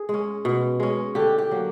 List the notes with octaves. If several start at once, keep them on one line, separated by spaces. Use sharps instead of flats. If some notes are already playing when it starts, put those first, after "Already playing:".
Already playing: G#4
G#3 C#4
B2
G#3 C#4
D3 G4
G4
F#3 A#3